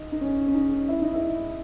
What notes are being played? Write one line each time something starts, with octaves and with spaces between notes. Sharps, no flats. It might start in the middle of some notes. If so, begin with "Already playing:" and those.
Already playing: D#4
D#4
C#4
C#4
D#4
E4
D#4
E4